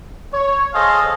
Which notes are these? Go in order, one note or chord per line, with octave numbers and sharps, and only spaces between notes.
C#5
G#4 A4 C5 D#5 F5